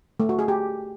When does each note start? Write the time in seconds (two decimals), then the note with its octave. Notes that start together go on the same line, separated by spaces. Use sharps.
0.20 A3
0.29 F#4
0.39 G#4
0.48 G4